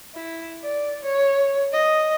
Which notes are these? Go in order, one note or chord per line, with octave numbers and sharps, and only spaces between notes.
E4
D5
C#5
D#5